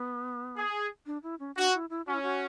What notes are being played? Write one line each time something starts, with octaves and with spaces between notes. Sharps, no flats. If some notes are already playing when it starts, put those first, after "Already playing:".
Already playing: B3
G#4
D4
E4
C#4
D4 F#4
E4
E4
C#4 F#4
E4
F#4